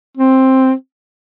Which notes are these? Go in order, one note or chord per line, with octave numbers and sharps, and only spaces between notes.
C4